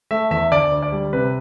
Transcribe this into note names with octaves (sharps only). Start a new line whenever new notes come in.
A3 E5
E2 E5
D2 D5
D2
D5
G3
C3 B4